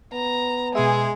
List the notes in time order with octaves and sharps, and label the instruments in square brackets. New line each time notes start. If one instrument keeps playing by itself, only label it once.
[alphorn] B3 [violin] A#5
[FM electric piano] B2 E5 [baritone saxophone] G#3 [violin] G#4